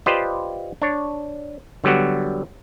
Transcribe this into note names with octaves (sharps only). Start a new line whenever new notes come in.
F4 G4 B4 C5 D5 D#5
D4 C#5
D3 F#3 G3 B3 F#4